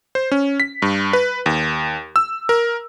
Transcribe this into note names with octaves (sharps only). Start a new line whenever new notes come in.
C5
C#4
B6
G2
B4
D#2
E6
A#4